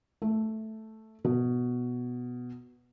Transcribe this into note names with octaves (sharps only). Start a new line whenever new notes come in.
A3
B2